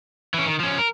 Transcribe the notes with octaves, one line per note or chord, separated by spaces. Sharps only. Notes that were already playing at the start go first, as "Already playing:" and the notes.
E3 C#4
D#3
F3 C#4
A#4